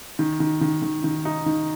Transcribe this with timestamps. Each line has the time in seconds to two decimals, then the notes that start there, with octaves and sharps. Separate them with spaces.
0.19 D#3
0.40 D#3
0.61 D#3
0.82 D#3
1.04 D#3
1.25 D#4
1.46 D#3